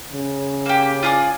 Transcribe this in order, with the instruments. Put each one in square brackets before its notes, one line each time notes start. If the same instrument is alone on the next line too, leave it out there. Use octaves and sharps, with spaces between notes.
[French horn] C#3
[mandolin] A#3 G4
F4 G#4 D5